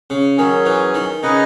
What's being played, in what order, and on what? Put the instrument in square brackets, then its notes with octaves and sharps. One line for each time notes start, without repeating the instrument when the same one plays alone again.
[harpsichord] C#3
[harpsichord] D#3 [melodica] F#3 C#4 G#4
[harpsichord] E3
D#3
[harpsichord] C#3 [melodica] D#4 G#4 B4 D#5